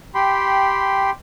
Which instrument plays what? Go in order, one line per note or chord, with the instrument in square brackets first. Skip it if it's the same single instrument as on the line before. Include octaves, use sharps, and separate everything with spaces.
[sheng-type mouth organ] G4 G5 B5 C6